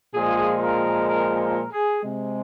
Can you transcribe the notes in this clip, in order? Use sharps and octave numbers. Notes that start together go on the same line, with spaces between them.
A#2 F3 G#3 G#4
A#4
A#4
A#4
G#4
C3 G#3